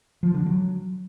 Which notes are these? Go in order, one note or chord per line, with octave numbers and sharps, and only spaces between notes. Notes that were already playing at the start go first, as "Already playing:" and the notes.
F3
D3
F#3